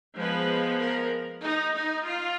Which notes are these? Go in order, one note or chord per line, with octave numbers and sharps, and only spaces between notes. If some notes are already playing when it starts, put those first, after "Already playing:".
F3 G#3 B3 B4
A#4
D#4
D#4
F4